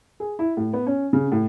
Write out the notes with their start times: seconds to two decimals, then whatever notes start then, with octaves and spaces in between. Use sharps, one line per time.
0.20 G#4
0.39 E4
0.57 A2
0.73 B3
0.87 C#4
1.13 C#3
1.32 A2